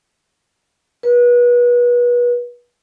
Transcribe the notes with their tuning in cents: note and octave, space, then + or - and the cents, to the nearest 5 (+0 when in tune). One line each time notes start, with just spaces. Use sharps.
B4 -30